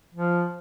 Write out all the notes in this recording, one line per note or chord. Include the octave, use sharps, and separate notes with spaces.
F3